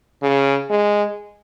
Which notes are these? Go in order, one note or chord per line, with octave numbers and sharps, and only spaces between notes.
C#3
G#3